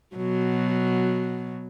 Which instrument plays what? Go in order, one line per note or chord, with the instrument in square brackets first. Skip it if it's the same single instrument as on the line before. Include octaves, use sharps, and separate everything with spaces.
[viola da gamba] B2 F#3